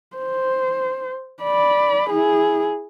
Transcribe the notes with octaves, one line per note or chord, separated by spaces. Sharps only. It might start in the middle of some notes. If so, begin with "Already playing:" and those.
C5
D5 B5
E4 G#4